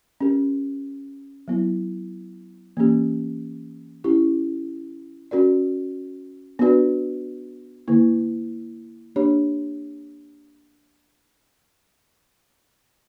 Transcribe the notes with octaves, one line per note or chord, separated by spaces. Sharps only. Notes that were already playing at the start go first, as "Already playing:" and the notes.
C#4 G4 A#4
F#3 B3 E4
E3 A#3 C#4 G4
C#4 E4 G4
C#4 F#4 A#4 D5
B3 D4 F#4 B4 D5
D3 A#3 E4
A#3 D4 G4 C#5